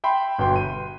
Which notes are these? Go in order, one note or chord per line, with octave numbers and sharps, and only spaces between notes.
E5 G5 B5 C6
G1 B2 B4 G5 C6
D#7